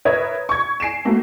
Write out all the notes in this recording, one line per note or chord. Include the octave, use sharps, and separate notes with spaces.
A#4 B4 C#5 E5 D#6 G#6
C#6 G#6
G#5 C7 D7 E7
A3 A#3 F#4